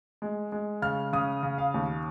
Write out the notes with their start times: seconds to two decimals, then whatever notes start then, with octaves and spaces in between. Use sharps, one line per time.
0.22 G#3
0.52 G#3
0.82 C#3 F6
1.13 C#3 D#6
1.43 C#3
1.58 F5
1.74 D#2